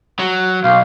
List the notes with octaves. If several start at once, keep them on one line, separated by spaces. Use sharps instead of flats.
F#3
B1 F5